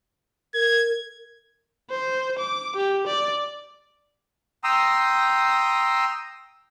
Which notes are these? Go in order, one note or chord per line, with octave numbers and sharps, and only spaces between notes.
A#4 G#6
C5
D6
G4
D5
G5 A#5 C6 D#6 E6